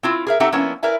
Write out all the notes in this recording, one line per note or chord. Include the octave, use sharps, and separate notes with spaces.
C4 E4 F4
G#4 A#4 E5
C4 D#4 G4 A4 E5 F#5
F3 A#3 B3 C#4 D4 E4
E4 A#4 B4 D5 E5 G#5